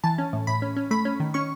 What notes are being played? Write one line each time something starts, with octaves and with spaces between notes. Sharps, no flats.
E3 A5
C#4
A2
A2 B5
C#4
C#4
A3 B5
C#4
D#3
C#4 C#6